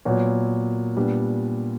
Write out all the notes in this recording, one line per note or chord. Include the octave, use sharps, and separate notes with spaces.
A#2 F#3 B3
A#2 G3 B3 D4